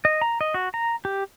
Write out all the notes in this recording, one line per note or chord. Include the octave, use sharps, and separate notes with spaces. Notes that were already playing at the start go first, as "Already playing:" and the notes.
D#5
A#5
D#5
F#4
A#5
G4